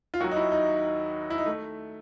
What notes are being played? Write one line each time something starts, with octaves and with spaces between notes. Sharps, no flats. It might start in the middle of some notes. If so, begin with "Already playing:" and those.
F4
D#2 D#3 F#3 F#4
D#4
E4
D#4
E4
D#4
A3